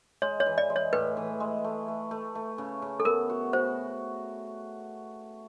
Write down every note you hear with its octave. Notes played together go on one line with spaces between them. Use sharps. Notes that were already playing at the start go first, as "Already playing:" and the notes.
G#3 C#5
C#5
E3
D5
G#3
C#5
A2 B4
E3
G#3
A3
A3
A3
A3
C#3
C#3
A4
B3 A#4
F#4
F#4 C5